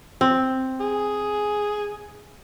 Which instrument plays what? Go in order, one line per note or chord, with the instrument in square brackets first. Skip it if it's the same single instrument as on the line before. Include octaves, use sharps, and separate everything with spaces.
[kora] C4
[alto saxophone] G#4